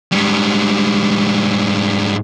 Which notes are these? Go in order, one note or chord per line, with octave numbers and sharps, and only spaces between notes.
G#2 G3